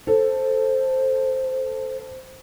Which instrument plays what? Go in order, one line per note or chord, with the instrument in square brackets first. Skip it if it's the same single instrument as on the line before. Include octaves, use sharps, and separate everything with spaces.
[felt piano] A4 [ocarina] C5